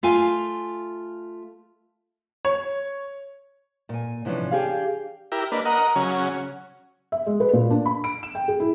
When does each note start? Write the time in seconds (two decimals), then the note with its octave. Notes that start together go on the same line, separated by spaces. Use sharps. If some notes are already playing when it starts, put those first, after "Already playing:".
0.03 A3 F4 F5 G#5
2.45 C#5
3.89 A#2 G#5
4.25 C3 E3 F3 C#4 D4
4.51 D4 G4 G#4 F5
5.32 E4 G4 A#4
5.52 A#3 D4 B4 D#5
5.65 A#4 D#5 F#5 A#5
5.96 C#3 F#3 C#4
6.11 F#5
7.12 E5
7.26 G#3
7.40 B4
7.53 A#2
7.70 D4
7.86 B5
8.04 D7
8.23 E7
8.35 G5
8.48 G#4
8.60 E4